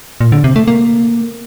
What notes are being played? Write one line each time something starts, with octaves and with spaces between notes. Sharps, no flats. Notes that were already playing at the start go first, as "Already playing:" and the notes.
A#2
D3
C3
A3
A#3